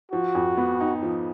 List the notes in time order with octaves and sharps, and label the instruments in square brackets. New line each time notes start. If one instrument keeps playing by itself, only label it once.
[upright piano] F3 [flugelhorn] F#4
[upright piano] F2
B3
D#4
F3